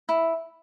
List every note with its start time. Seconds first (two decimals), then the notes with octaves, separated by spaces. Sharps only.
0.09 E4